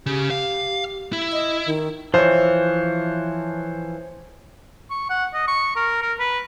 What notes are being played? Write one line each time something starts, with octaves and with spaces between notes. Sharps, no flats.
C#3 G4
F5
E4
D#5
D#3
E3 F3 C5 C#5
C#6
F#5
D#5
C#6
A#4
A#4
B4